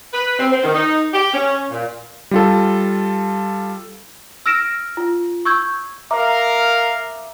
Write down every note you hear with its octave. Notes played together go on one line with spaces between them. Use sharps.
B4
C4
C4
D#3
D#4
G4
C#4
A#2
G3 F4 A4
E6 F6 A#6 D7 E7
F4
C#6 E6 G6 G#6
A#4 E5 F5 A#5 D6